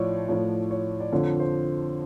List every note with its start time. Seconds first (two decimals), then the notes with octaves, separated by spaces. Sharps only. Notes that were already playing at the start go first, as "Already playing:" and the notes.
Already playing: A2 F3 C#5 D5
0.28 A2 F3 C#5
0.71 C#5
1.00 D5
1.12 F2 D3 F3 C#5
1.39 C5